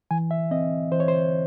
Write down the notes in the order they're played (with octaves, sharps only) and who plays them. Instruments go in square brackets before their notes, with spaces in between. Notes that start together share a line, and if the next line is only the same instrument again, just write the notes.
[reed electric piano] E3 G#5
E5
C4 D#5
E3 C5
C#5
C5